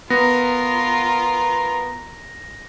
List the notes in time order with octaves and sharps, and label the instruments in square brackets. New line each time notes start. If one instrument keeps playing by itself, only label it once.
[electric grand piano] B3 [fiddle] F4 A#4 [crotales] A#6